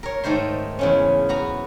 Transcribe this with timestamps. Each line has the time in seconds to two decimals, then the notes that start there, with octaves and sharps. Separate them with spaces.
0.03 A#4 C#5
0.24 G#2 D#3 A3 C5 C6
0.79 E2 C#3 C#4
1.29 B3 F#4 A#5